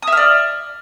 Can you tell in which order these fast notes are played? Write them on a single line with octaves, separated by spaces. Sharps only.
D#6 E5 F6 D5